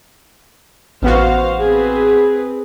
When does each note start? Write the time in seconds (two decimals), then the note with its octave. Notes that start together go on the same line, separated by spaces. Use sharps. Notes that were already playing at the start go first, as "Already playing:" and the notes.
1.02 A1 B3 F#4 C5 F5
1.62 C4 G#4 B4